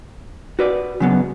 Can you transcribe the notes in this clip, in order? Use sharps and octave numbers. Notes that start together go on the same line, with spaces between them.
F#4 B4 D5
C#3 F#3 B3